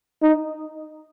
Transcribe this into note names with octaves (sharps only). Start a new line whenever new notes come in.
D#4